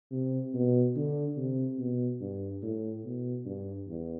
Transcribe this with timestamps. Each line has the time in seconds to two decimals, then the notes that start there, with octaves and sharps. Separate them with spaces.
0.11 C3
0.54 B2
0.95 D3
1.37 C3
1.78 B2
2.21 G2
2.62 A2
3.05 B2
3.46 G2
3.87 E2